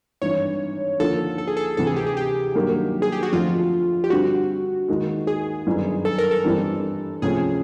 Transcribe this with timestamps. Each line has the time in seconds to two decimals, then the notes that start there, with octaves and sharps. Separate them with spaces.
0.21 G#1 G2 E3 C#5
0.99 D#2 D3 F3 A#3 A4
1.38 A4
1.47 G#4
1.57 A4
1.77 D2 C3 E3 A4
1.87 G#4
1.96 G4
2.06 G#4
2.17 G4
2.55 G2 D#3 F#3 A#3
3.02 G#4
3.12 G4
3.23 F#4
3.32 F2 D3 F3 A3 C4 F4
4.04 G4
4.10 G2 D3 G3 C4 F#4
4.88 D#2 D#3 G#3
5.27 G#4
5.66 G1 F#2 D#3
6.05 A4
6.18 A#4
6.31 A4
6.44 G1 G2 E3 G3 C4
7.22 C#2 C3 F3 A3 C#4 G#4